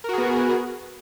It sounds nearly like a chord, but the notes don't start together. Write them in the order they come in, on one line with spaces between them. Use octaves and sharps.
A#4 F#4 G#4 B3